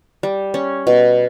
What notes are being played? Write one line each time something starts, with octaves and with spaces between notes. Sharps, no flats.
G3
C#4
B2